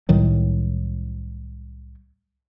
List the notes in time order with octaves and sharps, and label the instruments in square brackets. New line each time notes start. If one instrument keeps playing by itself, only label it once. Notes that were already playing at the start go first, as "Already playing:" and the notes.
[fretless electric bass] C2 A2 D#3 F#3